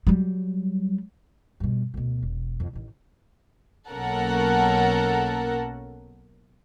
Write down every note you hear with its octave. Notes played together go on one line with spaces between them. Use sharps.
F#3 G3
G2 B2
D2 B2
E1
F2
A1 D#3
B1 A#3 C#4 A4 A#4 F#5